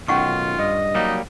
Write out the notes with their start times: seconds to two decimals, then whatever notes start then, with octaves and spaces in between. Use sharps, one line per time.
0.08 B1 D#3 C#4 F4 F#5 C#6
0.59 G2 D#5
0.95 F#3 G3 A#3 D#4